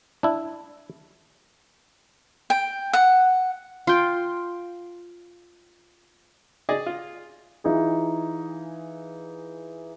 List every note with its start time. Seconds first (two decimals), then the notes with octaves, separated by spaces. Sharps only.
0.23 D4 E4
2.50 G5
2.93 F#5
3.87 F4 G5
6.69 G#4 D5 D#5
6.86 F4
7.64 E3 D#4 F4 G#4